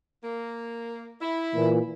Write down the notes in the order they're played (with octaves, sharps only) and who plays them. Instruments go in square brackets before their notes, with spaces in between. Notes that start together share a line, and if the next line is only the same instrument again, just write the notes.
[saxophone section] A#3
E4
[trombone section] A#2 E3